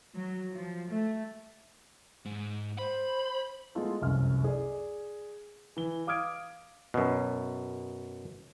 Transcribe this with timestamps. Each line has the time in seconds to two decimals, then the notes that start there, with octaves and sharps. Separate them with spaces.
0.15 F#3
0.51 F3
0.88 A3
2.25 G#2
2.78 C5 B5
3.75 G#3 A3 B3 F4 A4
4.01 F1 C2 F#2 F6
4.44 G#4 D5
5.77 E3 G7
6.07 F5 D6 D#6 F6 G#6 D7
6.94 F#2 B2